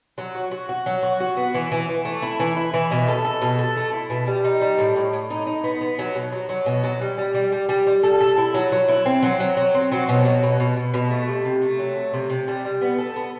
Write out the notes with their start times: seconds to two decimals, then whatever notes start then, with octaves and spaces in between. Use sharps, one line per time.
0.18 F#3
0.35 F#4
0.51 F#4
0.69 F#4
0.86 F#3
1.03 F#4
1.20 F#4
1.37 B3
1.54 E3
1.72 E3
1.89 E3
2.05 A3
2.22 E4
2.40 E3
2.56 E4
2.74 E3
2.91 B2
3.08 A4
3.25 A4
3.42 B2
3.59 A4
3.77 A3
3.93 E4
4.10 B2
4.27 G3
4.44 D#4
4.61 G3
4.78 A2
4.96 A2
5.13 A2
5.30 D#4
5.47 D#4
5.64 B3
5.81 B3
5.99 F#3
6.15 B2
6.32 F#3
6.49 F#3
6.66 B2
6.84 F#3
7.01 G3
7.18 G3
7.34 G3
7.52 G3
7.69 G3
7.87 G3
8.03 A4
8.21 A4
8.38 E4
8.54 F#3
8.72 F#3
8.89 E4
9.06 C4
9.23 F#3
9.40 F#3
9.57 F#3
9.74 C4
9.92 F#3
10.09 B2
10.25 F#3
10.43 B2
10.60 B2
10.76 B2
10.94 B2
11.11 A3
11.28 C3
11.45 C3
11.62 A3
11.79 F#3
11.96 A3
12.13 C3
12.30 C3
12.48 G3
12.65 G3
12.81 B3
12.98 A4
13.16 B3